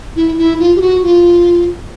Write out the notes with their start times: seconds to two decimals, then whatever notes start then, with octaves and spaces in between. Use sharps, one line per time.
0.16 E4
0.38 E4
0.60 F4
0.76 G4
0.81 F#4
1.03 F4